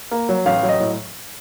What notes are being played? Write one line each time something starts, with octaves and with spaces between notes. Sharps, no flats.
A#3
F#3
A1 F5
F#3
D#5
A2